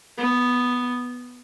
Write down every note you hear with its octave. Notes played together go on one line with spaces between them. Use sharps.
B3